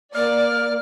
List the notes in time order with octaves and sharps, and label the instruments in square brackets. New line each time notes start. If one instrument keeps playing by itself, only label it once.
[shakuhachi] A#3 [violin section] D5 [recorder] F6